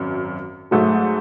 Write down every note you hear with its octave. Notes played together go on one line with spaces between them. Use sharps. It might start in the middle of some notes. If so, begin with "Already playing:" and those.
Already playing: G#1 F#2
G#2 F#3 A3